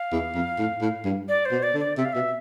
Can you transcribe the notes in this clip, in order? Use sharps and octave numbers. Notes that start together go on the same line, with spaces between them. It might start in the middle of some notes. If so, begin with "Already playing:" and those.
Already playing: F5
E2
F2
A2
A2
G2
D5
C5
B2
D5
D3
D5
C3 E5
F5
B2 E5